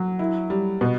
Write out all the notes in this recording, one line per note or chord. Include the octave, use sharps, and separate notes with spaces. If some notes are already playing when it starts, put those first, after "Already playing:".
Already playing: F#3
E4
G3
B2